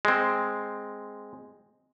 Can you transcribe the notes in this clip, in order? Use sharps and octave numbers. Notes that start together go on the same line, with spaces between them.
G#3 C4